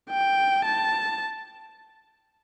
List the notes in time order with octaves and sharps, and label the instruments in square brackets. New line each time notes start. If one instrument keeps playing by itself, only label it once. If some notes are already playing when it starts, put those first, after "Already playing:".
[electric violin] G5
A5